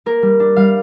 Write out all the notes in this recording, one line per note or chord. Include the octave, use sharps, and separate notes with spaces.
A#3 A#4
G3
D4
G3 F5